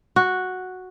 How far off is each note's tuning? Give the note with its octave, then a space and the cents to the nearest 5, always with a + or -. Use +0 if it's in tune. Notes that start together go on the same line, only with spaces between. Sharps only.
F#4 -5